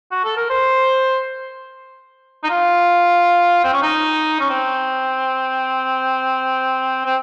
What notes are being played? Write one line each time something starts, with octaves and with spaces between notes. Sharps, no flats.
F#4
A4
A#4
C5
D#4
F4
C4
C#4
D#4
C#4
C4
C4